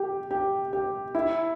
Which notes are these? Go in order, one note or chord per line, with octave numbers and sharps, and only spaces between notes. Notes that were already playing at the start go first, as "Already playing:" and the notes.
Already playing: G4
G4
G4
E4